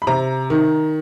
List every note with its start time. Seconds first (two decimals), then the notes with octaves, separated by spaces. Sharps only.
0.02 B5
0.07 C3 A#5
0.50 D#3